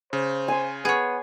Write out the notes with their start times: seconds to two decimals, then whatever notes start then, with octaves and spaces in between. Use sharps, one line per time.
0.13 C#3 C5
0.48 G#5 C6
0.85 B3 G#4 C#5